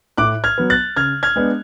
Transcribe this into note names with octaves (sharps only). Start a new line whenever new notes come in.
A2 D6 F#6
F6 G#6
F#3 B3
F#6 A6
C#3 F6 G#6
F6 G#6
G#3 B3 D4